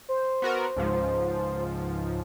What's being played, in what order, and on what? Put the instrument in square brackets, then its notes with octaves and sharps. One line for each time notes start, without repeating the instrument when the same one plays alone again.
[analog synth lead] C5
[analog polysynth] B3 F#4 A#4
C#2 G#2 F3